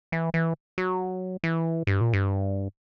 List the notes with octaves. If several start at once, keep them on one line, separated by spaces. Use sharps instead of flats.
E3
E3
F#3
E3
G2
A#2
G2